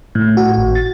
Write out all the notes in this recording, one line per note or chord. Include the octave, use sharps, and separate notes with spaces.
A2
F#4
G#1
A6